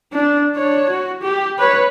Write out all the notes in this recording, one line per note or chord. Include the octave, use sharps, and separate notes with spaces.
D4
D4 C#5
F#4
G4
B4 C#5